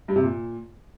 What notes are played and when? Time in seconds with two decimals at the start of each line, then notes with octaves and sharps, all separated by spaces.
0.08 G2
0.16 C3
0.23 A#2